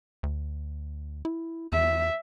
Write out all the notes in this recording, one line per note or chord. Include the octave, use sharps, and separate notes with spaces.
D2
E4
E2 E5